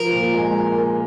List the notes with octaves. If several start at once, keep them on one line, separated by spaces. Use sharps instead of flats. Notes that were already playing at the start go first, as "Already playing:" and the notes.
Already playing: F3 A#4
A#2
G#3